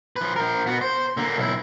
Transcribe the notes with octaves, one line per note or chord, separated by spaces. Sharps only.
F3 B4
F3 A#4
B3 F#4
C5
D3 A#3
B1 E4